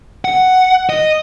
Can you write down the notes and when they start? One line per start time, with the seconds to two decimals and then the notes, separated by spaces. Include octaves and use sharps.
0.25 F#5
0.90 D#5